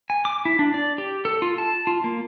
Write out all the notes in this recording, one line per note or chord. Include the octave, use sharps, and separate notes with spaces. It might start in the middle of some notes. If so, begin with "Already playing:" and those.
G#5
D6
E4
D4
D5
G4
A4
F4
A5
F4
A#3